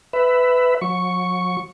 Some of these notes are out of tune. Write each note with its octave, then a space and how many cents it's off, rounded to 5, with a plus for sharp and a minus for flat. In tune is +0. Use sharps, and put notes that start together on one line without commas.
B4 +15 E5 +0
F#3 -40 C#6 +0